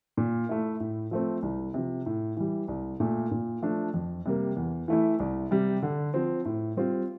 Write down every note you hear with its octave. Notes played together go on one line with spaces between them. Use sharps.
A#2
A3 E4
A2
F3 A3 C4
C2
C3 F3
A2
E3 G3
C2
A#2 A3
A#2
F3 A3 D4
F2
C3 G3 A#3
E2
E3 A3 E4
C2
C3 G3
D3
F3 C4
A2
G3 C4 F4